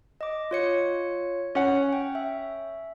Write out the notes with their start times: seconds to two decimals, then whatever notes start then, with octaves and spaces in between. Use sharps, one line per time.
0.21 D#5 D6
0.51 F4 C#5 C#7
1.55 C#4 F#5
1.93 G5
2.15 E5